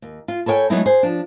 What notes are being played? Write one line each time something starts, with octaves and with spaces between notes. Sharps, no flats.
D#2
F4
A4 B4 C#5 E5 G5 G#5
F#3 G#3 A3 B3 D#4 E4
G#4 C5
F3 D4